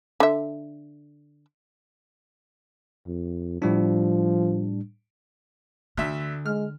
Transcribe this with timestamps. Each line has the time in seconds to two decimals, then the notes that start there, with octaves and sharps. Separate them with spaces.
0.20 D3 E5
3.07 F2
3.62 A2 F3 G3 D4
5.97 D2 D3 E5
6.46 G#3 F6